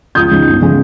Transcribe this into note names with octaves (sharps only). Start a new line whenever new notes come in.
C#2 D#6 G6
C#3 G#3 D#4
G1
C#3 G#3